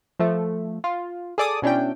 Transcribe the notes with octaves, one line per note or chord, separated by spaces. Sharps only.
F3 A3
F4
G#4 A4 D5 D6 D#6
B2 C#4 D4 E4 G5